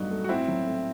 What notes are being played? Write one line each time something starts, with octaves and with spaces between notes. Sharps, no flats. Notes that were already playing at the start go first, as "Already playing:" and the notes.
Already playing: G2 F#3 A3 D#4 F#4
A3
F#4
A2 C4 E4
F#3
A2